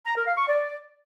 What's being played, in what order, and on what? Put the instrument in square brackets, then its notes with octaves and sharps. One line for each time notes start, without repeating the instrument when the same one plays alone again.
[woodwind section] A#5
A#4
F5
C#6
D5